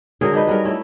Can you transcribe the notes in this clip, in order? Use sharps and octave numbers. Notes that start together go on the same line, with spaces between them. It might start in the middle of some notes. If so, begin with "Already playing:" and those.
D3 F#3 G#4 A#4
D4 D#4 B4
F#3 G3 C#4 A#4
A3 C#4 E4